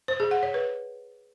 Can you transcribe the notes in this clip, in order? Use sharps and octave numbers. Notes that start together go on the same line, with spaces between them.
C5
G#4
F#5
C#5
B4